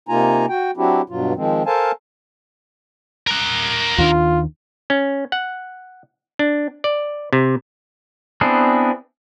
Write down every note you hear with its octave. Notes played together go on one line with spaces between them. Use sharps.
C3 A#3 D#4 F4 G#5 A#5
F#4 G5
F#3 C4 D4 E4 F#4 G4
G2 B2 F#3 F4
D#3 F3 G#3 C4
A4 A#4 C5 F5 G#5 A5
A#4 F#5
D#2 D#3 D4 F4
C#4
F#5
D4
D5
C3
B3 C4 D4 E4 G#4